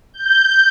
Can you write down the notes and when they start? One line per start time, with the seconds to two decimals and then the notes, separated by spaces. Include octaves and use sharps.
0.13 G6